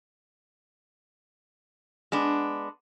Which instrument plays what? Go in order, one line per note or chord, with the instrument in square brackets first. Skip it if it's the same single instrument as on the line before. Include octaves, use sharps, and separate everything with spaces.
[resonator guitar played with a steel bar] G#3 B3 D4